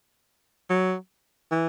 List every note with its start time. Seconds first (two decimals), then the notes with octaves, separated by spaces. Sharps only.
0.70 F#3
1.51 E3